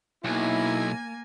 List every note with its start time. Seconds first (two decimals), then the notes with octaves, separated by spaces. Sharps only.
0.25 B1 A#3 D#4 E4 G#5